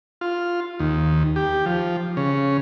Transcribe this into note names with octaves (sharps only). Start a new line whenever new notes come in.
F4
D#2
G4
F3
C#3